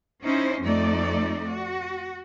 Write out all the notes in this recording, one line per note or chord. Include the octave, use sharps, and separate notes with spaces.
C#4 D#4 E4 C5
F2 A3 D#4 D5
F#4